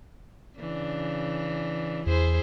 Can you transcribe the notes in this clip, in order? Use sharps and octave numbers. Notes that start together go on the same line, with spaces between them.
C#3 E3 D4
E2 E4 G#4 C5